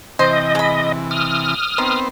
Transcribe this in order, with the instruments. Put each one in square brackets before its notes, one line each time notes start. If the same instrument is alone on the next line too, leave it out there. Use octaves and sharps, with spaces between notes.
[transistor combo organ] C3 E3 [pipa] C5 [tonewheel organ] D#5
[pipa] G#3 B5
[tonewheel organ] D#6 F6
[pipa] D#3 [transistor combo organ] B3 C4 C5